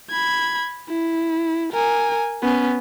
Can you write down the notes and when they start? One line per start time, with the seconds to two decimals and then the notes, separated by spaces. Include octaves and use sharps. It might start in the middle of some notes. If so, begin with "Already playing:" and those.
0.10 B5 G#6
0.89 E4
1.73 A#4 G#5
2.43 B3 C#4